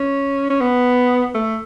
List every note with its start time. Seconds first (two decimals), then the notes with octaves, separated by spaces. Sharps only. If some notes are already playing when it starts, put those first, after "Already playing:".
Already playing: C#4
0.50 C#4
0.61 B3
1.35 A3